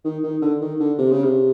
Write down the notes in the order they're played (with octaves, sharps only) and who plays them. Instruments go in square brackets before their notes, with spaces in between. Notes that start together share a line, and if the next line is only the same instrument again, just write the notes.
[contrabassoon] D#3
D#3
D3
D#3
D3
C3
C#3
C3